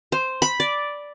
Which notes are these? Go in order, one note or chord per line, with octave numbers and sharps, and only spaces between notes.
C5
B5
D5